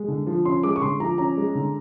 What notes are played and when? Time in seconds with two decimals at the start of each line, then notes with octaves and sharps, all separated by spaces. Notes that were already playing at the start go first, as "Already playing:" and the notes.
Already playing: G#3
0.08 D3
0.27 F3
0.45 C#4 C6
0.63 G#3 D6
0.76 C#6
0.82 D3 C6
1.00 F3 A#5
1.18 C#4 A#5
1.37 G#3
1.55 D3